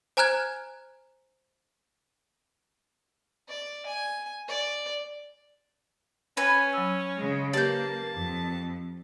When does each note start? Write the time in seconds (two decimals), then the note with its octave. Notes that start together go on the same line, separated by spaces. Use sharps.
0.17 C5 G#5 A#5 F6 F#6 G#6
3.48 D5
3.86 G#5
4.48 D5
6.37 C#4 B4 G#5
6.73 F#3 E6
7.17 C#3 G#3
7.53 A#3 G4 B4 D5 A5 G6
8.13 F2